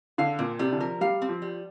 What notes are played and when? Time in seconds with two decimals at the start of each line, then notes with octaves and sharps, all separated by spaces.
0.18 D3 F5
0.39 A#2 C4
0.59 C3 G3
0.72 D3
0.80 F3 A#4
1.01 G3 F5
1.22 C4
1.29 F3
1.42 G3